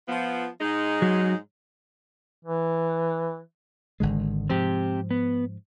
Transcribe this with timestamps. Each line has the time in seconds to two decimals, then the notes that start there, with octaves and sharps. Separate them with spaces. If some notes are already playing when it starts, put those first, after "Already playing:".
0.08 F3 B3
0.61 G#2 G#3 D#4
1.02 F#3
2.45 E3
4.00 G#1 D3 G#3
4.49 G#2 F3 C4 G4
5.11 B3